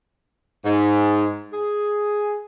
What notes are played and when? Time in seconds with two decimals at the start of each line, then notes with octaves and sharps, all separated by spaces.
0.65 G#2
1.53 G#4